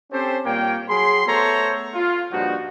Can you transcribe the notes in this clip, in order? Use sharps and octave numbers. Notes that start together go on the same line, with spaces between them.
C4 C#4 G4 A4 C5
A#2 G3 A#3 C#5 G5
F#3 G#4 B5 C6
A3 B3 A4 C5 C#5 A#5
F4
G2 A#2 F3 D#4 F#4